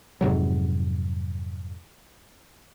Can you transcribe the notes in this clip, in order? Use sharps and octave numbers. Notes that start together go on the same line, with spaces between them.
F2 G#2 C3 F#3